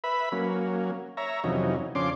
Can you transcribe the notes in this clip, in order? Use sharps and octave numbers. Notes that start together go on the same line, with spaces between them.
B4 E5 B5
F#3 A#3 C#4
C#5 E5 A#5
F2 C3 E3 F#3 C#4 D#4
F2 C#3 C#4 D4 C6 D6